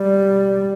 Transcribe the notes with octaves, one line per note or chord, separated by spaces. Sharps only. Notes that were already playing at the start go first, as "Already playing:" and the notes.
Already playing: G3